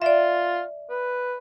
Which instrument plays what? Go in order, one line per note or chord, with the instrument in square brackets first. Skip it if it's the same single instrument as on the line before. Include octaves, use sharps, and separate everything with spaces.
[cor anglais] F4 [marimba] D5 E5
[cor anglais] B4